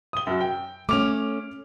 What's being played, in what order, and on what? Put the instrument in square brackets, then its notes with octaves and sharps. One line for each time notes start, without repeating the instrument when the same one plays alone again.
[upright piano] D#6 G7
F#2 F#4
G5
[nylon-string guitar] A3 C#4 [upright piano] D6 F6 F7